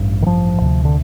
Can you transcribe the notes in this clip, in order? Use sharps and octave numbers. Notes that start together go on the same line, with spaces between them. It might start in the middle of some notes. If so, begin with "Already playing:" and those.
Already playing: A1 G2
D#3
F3
D2 C3
D3